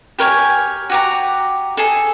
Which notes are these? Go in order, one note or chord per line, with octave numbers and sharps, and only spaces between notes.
G4 A#4 C#5 G#5
F#4 G4 A#5
G#4 A4